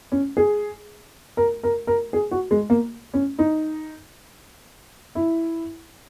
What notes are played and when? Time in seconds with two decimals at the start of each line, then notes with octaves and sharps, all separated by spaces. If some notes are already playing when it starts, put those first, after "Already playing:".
0.12 C#4
0.37 G#4
1.37 A#4
1.63 A#4
1.87 A#4
2.13 G#4
2.31 F#4
2.51 G#3
2.70 A#3
3.14 C#4
3.39 D#4
5.15 E4